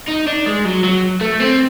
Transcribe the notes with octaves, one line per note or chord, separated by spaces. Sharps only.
D#4
D4
G#3
F#3
F#3
A3
C4